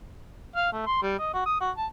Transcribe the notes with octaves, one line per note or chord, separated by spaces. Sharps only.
F5
A3
C6
G3
D#5
F#4
D#6
F#4
A5